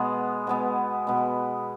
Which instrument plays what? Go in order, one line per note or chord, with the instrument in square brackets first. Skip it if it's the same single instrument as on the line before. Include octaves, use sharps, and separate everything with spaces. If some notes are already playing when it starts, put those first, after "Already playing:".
Already playing: [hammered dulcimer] B2 G#3 B3
B2 G#3 B3
B2 G#3 B3